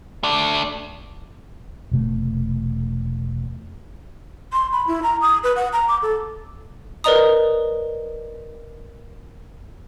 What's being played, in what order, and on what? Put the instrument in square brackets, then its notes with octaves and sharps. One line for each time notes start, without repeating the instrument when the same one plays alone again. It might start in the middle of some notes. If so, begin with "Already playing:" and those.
[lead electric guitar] A3 D4
[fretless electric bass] E1 C3 A3
[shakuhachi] C6
B5
E4
A#5
D#6
B4
F#5
A#5
D6
A4
[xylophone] A#4 B4 D5 D#5 A#5 D#6